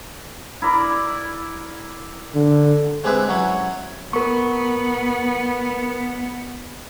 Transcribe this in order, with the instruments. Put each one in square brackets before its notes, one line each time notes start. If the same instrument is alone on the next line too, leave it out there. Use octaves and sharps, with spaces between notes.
[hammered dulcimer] E4 A#4 D5
[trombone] D3
[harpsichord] G#3 C4 G4 G#4 B4 E5
F#3 C#4 E4
[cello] B3 [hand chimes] A#4 C#6